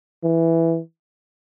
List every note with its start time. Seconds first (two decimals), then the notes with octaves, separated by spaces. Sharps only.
0.23 E3